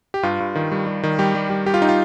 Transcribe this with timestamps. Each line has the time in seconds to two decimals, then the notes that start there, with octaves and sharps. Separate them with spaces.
0.14 G4
0.23 G2 F4
0.40 G2
0.55 D#3
0.72 G3
0.86 G3
1.03 D#3
1.19 G3 G4
1.35 G3
1.50 G3
1.66 G3 G4
1.74 F4
1.82 D#4
1.89 F4